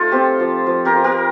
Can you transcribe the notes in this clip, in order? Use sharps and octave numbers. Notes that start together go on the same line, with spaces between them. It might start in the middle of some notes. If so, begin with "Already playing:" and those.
Already playing: A3 D#4 F4 A4 C5
C4 G4
F3
F3
G4 A#4
F4
G4 A#4